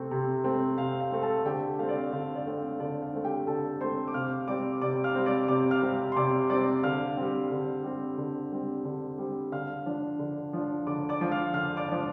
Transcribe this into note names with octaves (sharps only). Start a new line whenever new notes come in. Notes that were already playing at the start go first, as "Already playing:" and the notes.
Already playing: C3 A3 C4
C3
A3 C4
C3 F5
F5
A3 C4
A4 A5
D3 G4 G5
A3 C4 F5
D5
F5
D3 F5
D5
A3 C4
F5
D3 D5
F5
A3 C4
G4 G5
D3 A4 A5
A3 C4 C5 C6
D6
C3 F5 F6
G3 C4 D5 D6
C3 D5 D6
F5 F6
G3 C4
D5 D6
C3 D5 D6
F5 F6
G3 C4
C6
C3 D5 D6
G3 C4 D5 D6
D3 F5 F6
G3 C4
D3
G3 C4
D3
G3 C4
D3
G3 C4
D3 F5 F6
F3 D4
D3
F3 D4
D3 D5 D6
D5 D6
F3 D4
F5 F6
D3 F5 F6
D5 D6
F3 D4